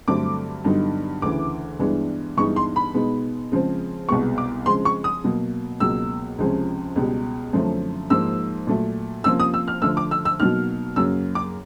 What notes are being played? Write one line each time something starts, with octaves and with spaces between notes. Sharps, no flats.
G2 D3 F#3 A3 C4 D6
G2 D3 F#3 B3 D#4
D2 C#3 E3 D6
G2 E3 G#3 B3 D4
G2 E3 G#3 B3 D#4 C#6
C6
B5
B2 G#3 B3 D#4
C#3 F3 G#3 C4
C2 B2 G#3 B3 C#6
D6
C#3 F3 G#3 C4 C6
C#6
D#6
B2 F#3 A#3
C#2 B2 F#3 A#3 E6
C#2 C3 F3 G#3 C#4
C#2 B2 G3
F#2 D3 F3 A3 C4
G#2 F3 A#3 D#4 E6
A#2 F#3 A3
C3 F3 A#3 C#4 F4 E6
D#6
E6
F6
D3 F3 A3 E6
D6
E6
E6
B2 F#3 A#3 D#4 F6
F#2 C#3 F#3 A#3 E6
D6